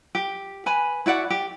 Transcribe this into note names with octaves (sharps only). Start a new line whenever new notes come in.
G4
B4 G#5 B5
E4 F#4 D5 F#5
G4